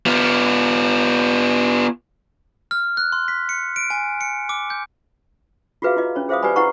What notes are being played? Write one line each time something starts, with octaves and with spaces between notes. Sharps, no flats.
B3 F4
F6
F#6
C6
B6
C#7
D7
G#5
C#7
D6
G6
F4 F#4 G#4 B4 E5 F5
E4 F4 D#5
C#4 C#5 B5
G#4 C5 E5 F5 B5 D#6
G4 B4 D5 G#5 B5
E4 G4 B4 F#5 A#5 C#6